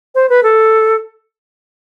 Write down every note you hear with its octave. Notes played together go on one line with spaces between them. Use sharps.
C5
B4
A4